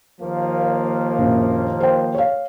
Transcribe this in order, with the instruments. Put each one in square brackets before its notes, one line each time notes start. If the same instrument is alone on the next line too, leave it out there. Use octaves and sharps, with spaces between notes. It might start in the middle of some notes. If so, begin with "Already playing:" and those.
[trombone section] D#2 F3 A#3
[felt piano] A#1 F#2
C5 G5
C#5 F5